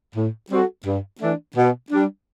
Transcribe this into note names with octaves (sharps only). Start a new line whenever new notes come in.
A2
G3 C4 F#4 A4
G2
E3 A3 D4
B2
G3 D4